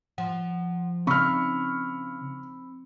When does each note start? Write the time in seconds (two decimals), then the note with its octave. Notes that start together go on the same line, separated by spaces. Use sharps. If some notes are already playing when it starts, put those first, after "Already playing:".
0.18 F3 F#5
1.07 C#3 C4 D#4 B5 C#6 E6 F6